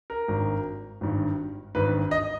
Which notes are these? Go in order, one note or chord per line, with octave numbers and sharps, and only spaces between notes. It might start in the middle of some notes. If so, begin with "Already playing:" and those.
A#4
G#1 G2 D#3
G#1 G2 D#3
G#1 G2 D#3 B4
D#5